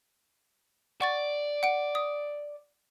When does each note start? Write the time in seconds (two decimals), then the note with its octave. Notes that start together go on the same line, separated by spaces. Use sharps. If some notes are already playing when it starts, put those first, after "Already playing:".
1.01 D5 F#5 C#6 A6
1.63 F#5 D7
1.95 D#6